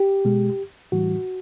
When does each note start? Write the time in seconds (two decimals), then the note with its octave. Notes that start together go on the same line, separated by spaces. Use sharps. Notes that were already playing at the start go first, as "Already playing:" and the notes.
Already playing: G4
0.25 B2 G#3
0.92 A2 E3 G3 F#4